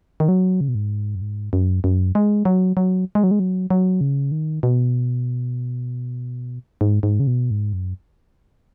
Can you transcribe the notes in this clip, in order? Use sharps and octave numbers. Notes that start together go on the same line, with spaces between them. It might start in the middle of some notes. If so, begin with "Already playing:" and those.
D#3
F#3
C#3
B2
G#2
F#2
G#2
F#2
F#2
G#3
F#3
F#3
G#3
F#3
G#3
F#3
F#3
C#3
D#3
B2
G#2
G#2
C#3
B2
G#2
F#2